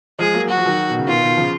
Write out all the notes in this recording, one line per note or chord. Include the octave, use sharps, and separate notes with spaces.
F3 G#3 G#4
F#3 A#3
F#3 F#4
F3
D#3 F#3
B2
C#3
B2 D#3 F4
B2 D#3
C#3 F3